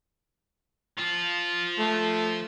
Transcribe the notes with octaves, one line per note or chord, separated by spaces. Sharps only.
F3 F4
A3